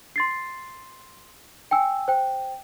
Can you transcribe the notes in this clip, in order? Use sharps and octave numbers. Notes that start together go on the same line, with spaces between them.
C6 A6 C7
G5 G#5 E6
C5 G5